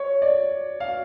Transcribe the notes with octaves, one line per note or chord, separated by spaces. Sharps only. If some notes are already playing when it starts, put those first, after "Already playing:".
Already playing: C#5
D5
F5